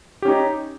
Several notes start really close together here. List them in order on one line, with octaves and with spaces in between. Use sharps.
G4 C#4 D#4